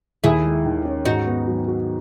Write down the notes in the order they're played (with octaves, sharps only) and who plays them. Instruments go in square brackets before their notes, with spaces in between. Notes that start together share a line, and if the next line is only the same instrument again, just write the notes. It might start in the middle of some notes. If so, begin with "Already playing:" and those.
[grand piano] D#2 [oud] E4 G#4
[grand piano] G#3
D#3
C#4
[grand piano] G#2 [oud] D#4 F#4
[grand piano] B3
F#3
F#4